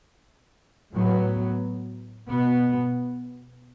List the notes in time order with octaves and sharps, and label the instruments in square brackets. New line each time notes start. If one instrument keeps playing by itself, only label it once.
[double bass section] A2 F#3 B3
B2 B3